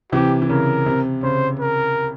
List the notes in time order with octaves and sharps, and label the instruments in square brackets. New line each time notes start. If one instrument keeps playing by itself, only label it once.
[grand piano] C3 E3 [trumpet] G4
[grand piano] E3
[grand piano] C#3 [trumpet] A#4
[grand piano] C3
[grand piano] C#3 [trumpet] C5
[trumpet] A#4